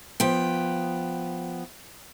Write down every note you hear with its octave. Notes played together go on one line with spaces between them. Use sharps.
F3 B3 G5